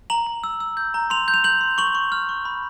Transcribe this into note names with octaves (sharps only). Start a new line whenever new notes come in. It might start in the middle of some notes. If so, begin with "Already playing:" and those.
A#5 F#7
A#5
E6
E6
G6
A#5
C6 F7
G6
F7
G6 F#7
C6
C#6 F#7
C#6
F6
C#6
B5